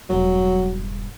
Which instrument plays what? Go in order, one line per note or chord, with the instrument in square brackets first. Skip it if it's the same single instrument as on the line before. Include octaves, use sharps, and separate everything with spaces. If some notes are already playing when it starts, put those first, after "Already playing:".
[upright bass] E1 G2 [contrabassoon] F#3